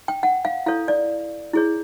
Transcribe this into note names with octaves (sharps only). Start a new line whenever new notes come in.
G5
F#5
F5
E4 A4 C#5 F5
D5
E4 G#4 C#5